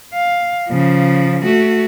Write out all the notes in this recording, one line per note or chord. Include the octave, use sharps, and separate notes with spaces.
F5
C#3 F3
A3 F#4